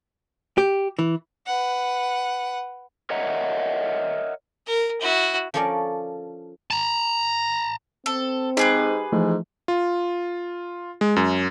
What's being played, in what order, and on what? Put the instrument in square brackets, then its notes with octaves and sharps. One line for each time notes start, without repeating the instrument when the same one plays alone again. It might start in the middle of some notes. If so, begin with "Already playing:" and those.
[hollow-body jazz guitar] G4
E3
[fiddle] B4 F#5
[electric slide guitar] A#4 C#5 D#5 E5 F#5 A#5
[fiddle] A#4
E4 F#4
[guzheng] F3 C#4 A4 A#4 D5
[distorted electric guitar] A5 A#5
[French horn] C4 [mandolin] A4
[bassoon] G#2 [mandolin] G4 G#4 B4
[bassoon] G#2 [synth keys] E3 F3 A3
[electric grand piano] F4
G#3
F#2